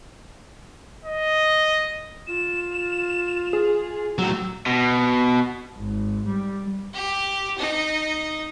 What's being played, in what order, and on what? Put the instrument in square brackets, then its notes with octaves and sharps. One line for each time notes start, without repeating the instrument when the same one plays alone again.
[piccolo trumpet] D#5
[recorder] F4 [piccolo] E7
[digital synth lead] G#4
[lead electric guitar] A2 F#3 [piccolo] E6
[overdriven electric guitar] B2
[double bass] G#1
G3
[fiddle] G4
D#4